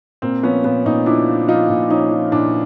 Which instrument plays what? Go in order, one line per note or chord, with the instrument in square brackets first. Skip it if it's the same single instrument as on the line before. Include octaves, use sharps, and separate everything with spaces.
[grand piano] A#2 A#3 C4
F3 B3 C#4
A#2 B3 C#4
A#2 C#4 D#4
F3 D4 E4
F3
F3 D#4 F4
A#2
F3 C#4 D#4
F3
A#2 D4 E4